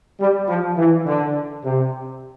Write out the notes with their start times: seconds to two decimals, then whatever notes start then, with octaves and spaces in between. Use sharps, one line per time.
0.19 G3
0.48 F3
0.77 E3
1.06 D3
1.64 C3